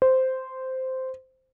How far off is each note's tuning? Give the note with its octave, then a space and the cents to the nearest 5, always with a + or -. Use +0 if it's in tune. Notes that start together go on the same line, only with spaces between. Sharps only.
C5 -10